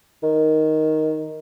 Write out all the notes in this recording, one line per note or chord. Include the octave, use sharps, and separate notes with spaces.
D#3